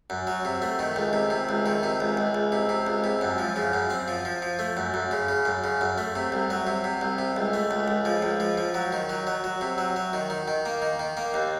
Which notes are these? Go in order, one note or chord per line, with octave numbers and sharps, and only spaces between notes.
F#2
F#3
C3
A3
D#3
C#2
C3
C3
C#2
D#3
C3
C#2
C#2
C#2
C3
C3
C#2
C3
F#2
F3
C#3
F#2
C4
F3
F3
F3
A3
F#2
F#2
C#3
C#3
F#2
C#3
F#2
A3
C3
C2
F#3
C3
C3
C2
C3
C#2
A3
C#2
C#2
F3
C#2
F3
F3
F#3
D#3
F#3
F#3
F#3
C3
F#3
F#3
D#3
D#3
D#3
A#3
D#3
D#3
A#3
D#2